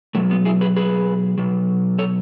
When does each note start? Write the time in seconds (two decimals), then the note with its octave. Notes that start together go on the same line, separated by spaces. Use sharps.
0.15 B2 F#3 A3
0.30 G#3 B3
0.45 E4 G#4
0.61 G#4 B4
0.76 G#4 B4
1.38 B2 F#3
1.98 A4 C#5